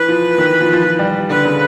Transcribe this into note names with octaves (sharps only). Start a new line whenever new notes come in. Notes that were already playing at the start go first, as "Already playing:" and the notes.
Already playing: E3 B4
F3
D#3
E3
F3
F3
F3
G3
D3 B4
C#3